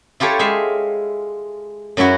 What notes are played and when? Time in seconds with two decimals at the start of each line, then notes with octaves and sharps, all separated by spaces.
0.20 E4 F4 G4 A4 C#5
0.39 G#3 E5 F5
1.97 F#2 F#3 C#4 E4 F#4